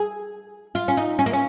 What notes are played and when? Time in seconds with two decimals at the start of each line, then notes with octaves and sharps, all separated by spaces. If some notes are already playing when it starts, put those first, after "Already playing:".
Already playing: G#4
0.75 F4
0.88 C#4
0.97 D#4
1.19 C#4
1.26 A#3
1.33 C#4